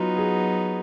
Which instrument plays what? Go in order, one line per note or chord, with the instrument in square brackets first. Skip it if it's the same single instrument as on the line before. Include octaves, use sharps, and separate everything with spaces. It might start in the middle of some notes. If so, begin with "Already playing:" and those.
Already playing: [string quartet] F#3 B3 D#4 [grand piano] F4 F#4
[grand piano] G#4